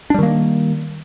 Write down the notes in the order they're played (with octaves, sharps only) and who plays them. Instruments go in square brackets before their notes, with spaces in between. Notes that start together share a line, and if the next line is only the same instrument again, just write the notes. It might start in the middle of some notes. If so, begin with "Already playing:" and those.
[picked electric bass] D4
G3
D#3
A#3